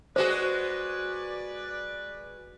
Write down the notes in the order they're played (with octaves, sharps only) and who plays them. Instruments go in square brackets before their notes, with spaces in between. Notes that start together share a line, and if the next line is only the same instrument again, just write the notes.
[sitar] G#3 F#4 G#4 [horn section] B4 D5 [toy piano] C5